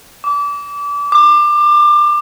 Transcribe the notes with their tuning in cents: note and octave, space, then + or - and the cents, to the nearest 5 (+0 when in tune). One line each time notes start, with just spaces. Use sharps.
D6 -30
D6 +25